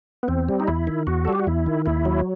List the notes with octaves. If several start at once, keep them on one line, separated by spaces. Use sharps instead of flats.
B3
E2 C4
G3
D#4
E2 E4
D#3
E2 F#4
A4
G3 G4
F#4
E2 E4
D#3
D#2 E4
F#3